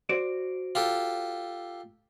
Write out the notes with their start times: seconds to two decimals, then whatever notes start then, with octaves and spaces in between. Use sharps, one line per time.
0.09 F#4 C5 D5
0.75 F4 G4 A4